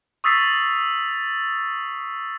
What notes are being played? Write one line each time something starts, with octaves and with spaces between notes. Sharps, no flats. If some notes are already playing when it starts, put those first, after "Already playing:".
C#6 D#6 E6 A6 B6 C7